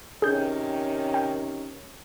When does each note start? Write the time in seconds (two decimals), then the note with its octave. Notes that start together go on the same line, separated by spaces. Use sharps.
0.22 C3 D#3 C#4 G#4 G6
1.14 G5